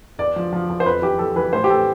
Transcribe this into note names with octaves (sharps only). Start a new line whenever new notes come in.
E2 D5
F3
F3
E2
C5
F2 B4
E3 G4
E3 A4
E3 B4
A2 C5
G4
A2 A4